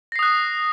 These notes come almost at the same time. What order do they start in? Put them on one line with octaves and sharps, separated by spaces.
A#6 C7 D#6 F#6